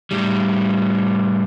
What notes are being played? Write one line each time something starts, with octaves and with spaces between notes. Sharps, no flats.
A2 G3